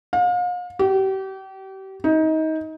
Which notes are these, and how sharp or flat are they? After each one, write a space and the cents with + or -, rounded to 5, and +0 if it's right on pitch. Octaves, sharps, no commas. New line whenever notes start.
F5 +40
G4 -35
D#4 +25